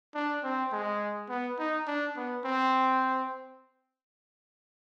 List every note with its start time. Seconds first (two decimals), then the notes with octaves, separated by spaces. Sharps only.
0.15 D4
0.43 C4
0.72 G#3
1.29 B3
1.59 D#4
1.87 D4
2.16 B3
2.45 C4